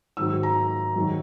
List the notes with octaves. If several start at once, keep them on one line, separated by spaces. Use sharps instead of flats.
G#2 D#3 F#3 E6
A#5
F#2 D#3 F#3